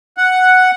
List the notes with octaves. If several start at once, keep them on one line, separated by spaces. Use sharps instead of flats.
F#5